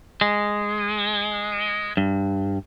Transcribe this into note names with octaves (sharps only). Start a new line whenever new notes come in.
G#3
G2